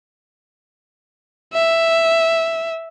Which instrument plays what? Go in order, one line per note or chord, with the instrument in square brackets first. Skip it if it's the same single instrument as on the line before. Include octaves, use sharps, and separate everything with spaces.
[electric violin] E5